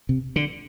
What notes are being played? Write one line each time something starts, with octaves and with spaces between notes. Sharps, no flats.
C3
D3